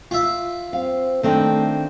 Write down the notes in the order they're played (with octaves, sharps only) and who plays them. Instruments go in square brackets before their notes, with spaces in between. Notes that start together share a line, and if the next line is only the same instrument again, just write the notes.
[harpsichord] F4 E5
[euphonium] C4 [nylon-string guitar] F5
[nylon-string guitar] D#3 C4 D4 [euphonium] A3